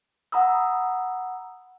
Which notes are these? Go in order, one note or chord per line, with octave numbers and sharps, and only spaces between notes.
F#5 A#5 B5 D#6 E6